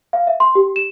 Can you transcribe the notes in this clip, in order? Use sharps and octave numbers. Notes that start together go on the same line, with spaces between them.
F5
E5
C6
G4
E7